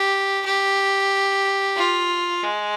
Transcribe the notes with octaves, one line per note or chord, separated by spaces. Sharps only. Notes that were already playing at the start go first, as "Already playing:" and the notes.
Already playing: G4
G4
F4
G#3